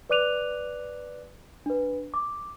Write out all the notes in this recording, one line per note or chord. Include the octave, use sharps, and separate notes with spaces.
B4 D5 D6 F#6 D#7 F7
D4 B4
D6